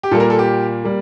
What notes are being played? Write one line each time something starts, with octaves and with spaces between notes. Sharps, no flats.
G4
A#2 G3 A#3 A4
A#4
A4
G4
G3 A#3